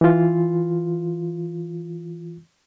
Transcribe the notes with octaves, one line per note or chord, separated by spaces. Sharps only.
E3 F4